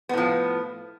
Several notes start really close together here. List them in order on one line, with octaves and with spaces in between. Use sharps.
B3 A2 F3